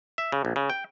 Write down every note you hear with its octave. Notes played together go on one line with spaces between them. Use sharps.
E5
C#3
A#1
C#3
G5